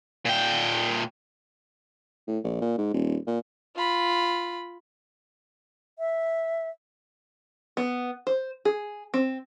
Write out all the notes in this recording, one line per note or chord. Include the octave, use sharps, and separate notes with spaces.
A#2 G5
A2
A#1
A#2
G#2
D#1
A#2
F4 B5
E5
B3
C5
G#4
C4